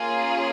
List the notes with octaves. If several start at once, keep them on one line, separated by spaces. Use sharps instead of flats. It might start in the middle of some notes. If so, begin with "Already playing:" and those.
Already playing: A#3 C#4 F4 G#4